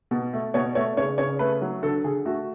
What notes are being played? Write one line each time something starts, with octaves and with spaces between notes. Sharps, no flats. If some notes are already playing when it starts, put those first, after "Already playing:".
B2
A3
B2 C#5
A3 C#5
C#3 C#5
C#3 C#5
A3 B4
F#3
D3 A4
D3 G#4
A3 F#4